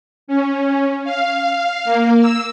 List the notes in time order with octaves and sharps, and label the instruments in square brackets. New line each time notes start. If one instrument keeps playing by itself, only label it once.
[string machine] C#4
F5
A#3
E6